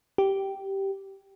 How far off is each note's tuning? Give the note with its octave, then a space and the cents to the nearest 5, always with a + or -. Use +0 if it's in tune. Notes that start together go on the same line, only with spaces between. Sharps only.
G4 -10